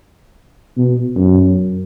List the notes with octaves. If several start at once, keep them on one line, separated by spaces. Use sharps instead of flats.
B2
F#2